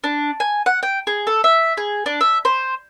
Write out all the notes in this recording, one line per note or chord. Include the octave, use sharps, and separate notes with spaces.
D4
G#5
F#5
G5
G#4
A4
E5
G#4
D4
E5
C5